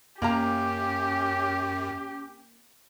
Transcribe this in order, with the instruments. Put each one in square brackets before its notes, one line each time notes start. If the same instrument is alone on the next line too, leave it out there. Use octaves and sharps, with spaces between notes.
[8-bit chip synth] F#2 [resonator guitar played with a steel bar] A#3 F5 A#5 [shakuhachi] C#4 [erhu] G4